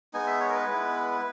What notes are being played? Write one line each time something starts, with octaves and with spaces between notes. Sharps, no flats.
G#3 B3 D#4 G#5
E5
C#5
A#4
B4
G#3 B3 E4